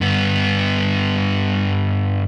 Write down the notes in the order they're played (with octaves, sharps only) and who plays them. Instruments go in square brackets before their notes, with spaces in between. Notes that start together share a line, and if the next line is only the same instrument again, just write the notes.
[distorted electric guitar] G2 B3